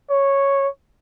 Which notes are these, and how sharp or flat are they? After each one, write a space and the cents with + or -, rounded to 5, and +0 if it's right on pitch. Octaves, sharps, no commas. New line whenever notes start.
C#5 -5